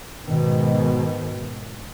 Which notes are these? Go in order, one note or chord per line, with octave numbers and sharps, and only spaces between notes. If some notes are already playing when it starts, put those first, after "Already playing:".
G#2 B2 D#3